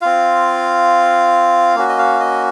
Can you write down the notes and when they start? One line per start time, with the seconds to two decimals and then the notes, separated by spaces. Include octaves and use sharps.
0.01 C4 F4 F5
1.76 A#3 C#4 F#4
1.89 D#5
1.98 F5
2.20 D#5